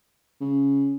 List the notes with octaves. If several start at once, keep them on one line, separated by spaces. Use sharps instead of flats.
C#3